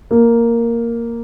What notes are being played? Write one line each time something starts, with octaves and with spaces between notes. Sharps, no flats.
A#3